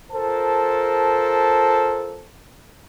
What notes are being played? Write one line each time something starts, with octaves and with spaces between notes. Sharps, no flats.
F4 A4 A#4 C5 A5